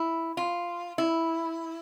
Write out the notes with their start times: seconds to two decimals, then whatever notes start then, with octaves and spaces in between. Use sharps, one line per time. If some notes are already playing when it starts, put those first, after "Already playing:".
Already playing: E4
0.37 F4
0.98 E4